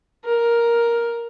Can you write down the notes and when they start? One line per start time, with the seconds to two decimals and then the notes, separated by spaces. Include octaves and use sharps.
0.25 A#4